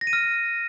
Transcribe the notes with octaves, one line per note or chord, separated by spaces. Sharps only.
A#6
D#7
F6